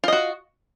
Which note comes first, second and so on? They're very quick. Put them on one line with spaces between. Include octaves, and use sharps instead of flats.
F4 D#5 F#4